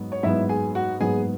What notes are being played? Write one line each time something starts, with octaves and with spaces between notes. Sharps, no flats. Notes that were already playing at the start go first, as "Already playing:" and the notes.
Already playing: G#2 F#3 B3
C#5
G#2 F#3 B3 E4 E5
G#4 G#5
F#4 F#5
G#2 F#3 B3 G#4 G#5